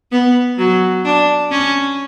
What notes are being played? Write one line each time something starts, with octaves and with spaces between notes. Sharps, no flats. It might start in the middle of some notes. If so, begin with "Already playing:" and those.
B3
F#3
D4
C#4